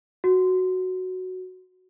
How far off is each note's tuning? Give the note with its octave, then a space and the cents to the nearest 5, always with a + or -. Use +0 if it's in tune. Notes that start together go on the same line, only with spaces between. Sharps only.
F#4 +0